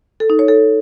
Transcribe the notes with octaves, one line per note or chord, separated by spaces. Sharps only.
A4
D#4
C#5
A4